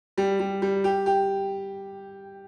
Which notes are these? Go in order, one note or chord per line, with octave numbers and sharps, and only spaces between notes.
G3
G3
G3
G4
G4